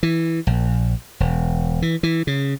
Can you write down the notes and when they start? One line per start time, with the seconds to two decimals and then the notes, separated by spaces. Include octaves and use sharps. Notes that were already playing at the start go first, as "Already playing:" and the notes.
0.03 E3
0.47 A#1
1.20 E1
1.82 E3
2.03 E3
2.27 C#3